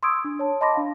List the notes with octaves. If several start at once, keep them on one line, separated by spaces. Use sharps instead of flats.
C6 C#6 D#6 E6 G#6 D7
D4
C#5 A5
D#5 A5 B5 C6 D6 A#6
D4 F5